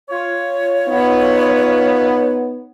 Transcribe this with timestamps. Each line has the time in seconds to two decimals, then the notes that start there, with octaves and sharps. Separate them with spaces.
0.10 F4 C#5
0.87 B3 D#4